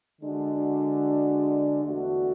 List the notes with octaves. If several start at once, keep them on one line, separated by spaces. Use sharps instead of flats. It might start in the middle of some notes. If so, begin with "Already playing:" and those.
D3 G#3 D4 F#4
E2 D3 A3 D4 F#4